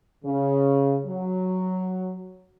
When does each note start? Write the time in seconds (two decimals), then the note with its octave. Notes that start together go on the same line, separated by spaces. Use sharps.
0.25 C#3
1.06 F#3